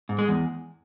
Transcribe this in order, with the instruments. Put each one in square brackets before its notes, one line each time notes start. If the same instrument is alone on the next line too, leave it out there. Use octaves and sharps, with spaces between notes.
[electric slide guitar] G#2
G#3
E2